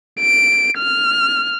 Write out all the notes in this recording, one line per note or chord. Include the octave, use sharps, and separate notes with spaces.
D7
F6